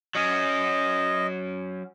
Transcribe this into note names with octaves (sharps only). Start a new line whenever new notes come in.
F#3 C#4 D#5